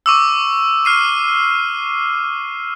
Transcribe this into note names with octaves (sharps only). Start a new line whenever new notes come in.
C#6 D6 E6
F6 C7 D#7